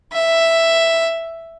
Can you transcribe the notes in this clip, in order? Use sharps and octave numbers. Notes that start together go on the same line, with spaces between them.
E5